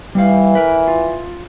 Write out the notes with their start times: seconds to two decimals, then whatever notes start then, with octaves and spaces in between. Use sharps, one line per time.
0.15 E3 G3 F5
0.55 A#4 B4
0.88 F4